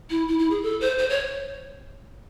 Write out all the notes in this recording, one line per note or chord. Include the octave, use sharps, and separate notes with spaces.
E4
E4
E4
G#4
A4
C5
C5
C#5